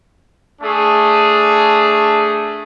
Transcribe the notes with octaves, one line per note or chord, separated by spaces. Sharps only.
A3 D4 G#4